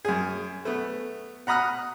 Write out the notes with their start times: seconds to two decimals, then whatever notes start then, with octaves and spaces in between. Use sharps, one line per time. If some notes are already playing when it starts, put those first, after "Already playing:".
0.05 F#2 G#4
0.65 A3 B3
1.47 F#5 A#5 B5 D#6 F6 F#6